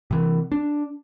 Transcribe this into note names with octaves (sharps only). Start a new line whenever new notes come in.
C3 E3
D4